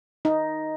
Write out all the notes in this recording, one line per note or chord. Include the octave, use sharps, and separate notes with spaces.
D#4